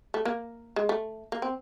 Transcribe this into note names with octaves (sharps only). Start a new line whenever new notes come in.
A3
A#3
G#3
A3
A#3
C4